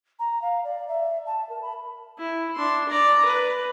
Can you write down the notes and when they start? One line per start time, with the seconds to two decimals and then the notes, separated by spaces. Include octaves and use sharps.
0.19 A#5
0.41 F5
0.64 D5
0.88 E5
1.25 A5
1.49 A#4
1.61 B5
2.19 E4
2.56 D4 C6
2.89 D5 A#5
3.25 B4